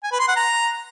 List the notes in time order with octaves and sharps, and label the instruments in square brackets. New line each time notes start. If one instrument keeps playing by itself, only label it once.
[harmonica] G#5
B4
C6
F#5
A#5